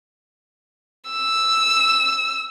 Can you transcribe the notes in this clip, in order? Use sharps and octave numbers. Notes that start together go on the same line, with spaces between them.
E6